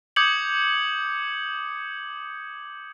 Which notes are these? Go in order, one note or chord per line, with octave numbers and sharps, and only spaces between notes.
D6 D#6 G6 G#6 C#7 F#7